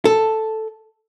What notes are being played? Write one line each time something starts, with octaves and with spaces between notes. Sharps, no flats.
A4